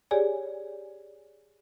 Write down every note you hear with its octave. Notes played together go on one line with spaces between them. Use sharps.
G4 G#4 C#5 D5 G#5